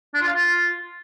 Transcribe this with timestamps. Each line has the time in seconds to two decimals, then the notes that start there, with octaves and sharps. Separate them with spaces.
0.14 D4
0.21 F4
0.28 F5
0.35 F4